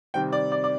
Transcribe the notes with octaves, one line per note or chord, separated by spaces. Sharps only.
C3 D#3 G3 C4 G5
D5
D5
D5